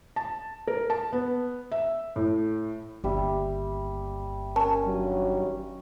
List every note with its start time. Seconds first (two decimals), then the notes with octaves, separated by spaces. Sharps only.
0.16 A5
0.67 A#4
0.90 A5
1.13 B3
1.72 E5
2.16 A2
3.04 G1 D#2 G3 E5
4.56 C#4 A#4 A5
4.84 G2 D#3 F#3 D#5